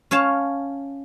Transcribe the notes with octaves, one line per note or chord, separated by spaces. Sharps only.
C#4 C#5 F5 A5